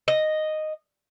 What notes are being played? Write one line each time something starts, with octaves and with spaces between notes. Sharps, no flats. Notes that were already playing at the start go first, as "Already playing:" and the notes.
D#5